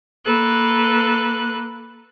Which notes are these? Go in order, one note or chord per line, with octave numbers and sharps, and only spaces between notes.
A#3 A4 B4 F#6